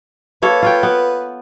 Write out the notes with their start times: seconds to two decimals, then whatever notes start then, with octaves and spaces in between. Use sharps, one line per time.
0.42 A#3 A4 B4 C#5
0.63 F4 C#5 G5
0.83 B3